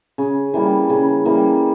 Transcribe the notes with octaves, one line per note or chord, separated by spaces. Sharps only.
C#3
E3 G3 A#3
C#3
E3 G3 A#3